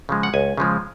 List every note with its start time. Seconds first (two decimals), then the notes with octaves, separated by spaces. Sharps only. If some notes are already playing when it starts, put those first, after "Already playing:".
0.09 C#3 F3 G#3
0.23 F#5
0.34 C#2 G#5
0.57 C#3 F3 G#3